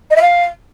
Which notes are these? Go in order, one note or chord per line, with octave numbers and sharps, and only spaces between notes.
D#5
E5
F5